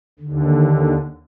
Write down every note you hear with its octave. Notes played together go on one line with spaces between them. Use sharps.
D#2 D3